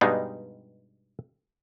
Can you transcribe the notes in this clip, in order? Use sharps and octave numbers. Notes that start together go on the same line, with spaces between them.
G2 B2 G3 G#3 B3 D#4